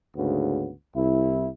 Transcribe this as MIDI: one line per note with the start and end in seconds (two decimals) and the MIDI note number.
0.16 0.70 38
0.16 0.70 44
0.16 0.70 49
0.16 0.70 59
0.96 1.47 36
0.96 1.47 64